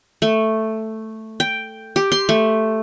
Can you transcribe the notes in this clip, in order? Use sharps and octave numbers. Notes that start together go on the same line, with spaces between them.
A3
G5
G4
C6
A3